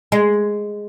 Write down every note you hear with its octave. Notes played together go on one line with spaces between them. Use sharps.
G#3